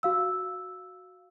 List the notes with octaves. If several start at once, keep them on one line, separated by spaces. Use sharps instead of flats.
F#4 F5 E6